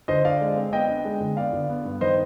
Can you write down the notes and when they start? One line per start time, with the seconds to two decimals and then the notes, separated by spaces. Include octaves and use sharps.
0.08 D3 C5 D#5
0.24 D3 D5 F5
0.41 G#3
0.57 C4
0.73 B3 D#5 G5
0.89 D4
1.05 G#3
1.21 D3
1.37 B3 D5 F5
1.53 D3
1.69 B3
1.85 G2
2.01 D#3 C5 D#5